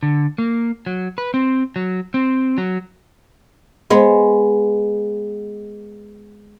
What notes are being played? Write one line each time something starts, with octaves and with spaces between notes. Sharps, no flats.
D3
A#3
F#3
B4
C4
F#3
C4
F#3
G#3 B3